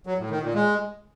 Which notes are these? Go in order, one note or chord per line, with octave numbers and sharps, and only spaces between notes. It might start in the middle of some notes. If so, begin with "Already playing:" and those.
F#3
A2
D#3
A#2
G#3